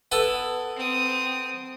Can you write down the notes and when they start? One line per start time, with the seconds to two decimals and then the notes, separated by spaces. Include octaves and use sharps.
0.12 B3 E4 A4
0.77 C4 D#6